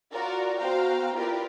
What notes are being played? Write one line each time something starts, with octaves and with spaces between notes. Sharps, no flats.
F4 F#4 A#4 D5
B3 F#4 C5 F5 G5 A#5
E4 F4 G4 A#4 B4 D5